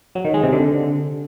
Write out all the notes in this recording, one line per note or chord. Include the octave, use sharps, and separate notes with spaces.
F#3
D#3
G#3
C3
D3